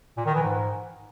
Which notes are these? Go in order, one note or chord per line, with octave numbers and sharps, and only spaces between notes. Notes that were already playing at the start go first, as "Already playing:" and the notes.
A#2
D#3
E3
G#2